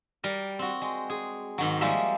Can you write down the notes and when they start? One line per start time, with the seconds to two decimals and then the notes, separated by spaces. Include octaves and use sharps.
0.24 G3 A#4
0.59 C4 F#4
0.82 G#3
1.10 G#4
1.58 G#2 D#3 F#3
1.81 F3 G3 G#3 A#3 E5